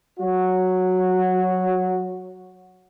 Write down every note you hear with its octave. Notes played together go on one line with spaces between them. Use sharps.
F#3 F#4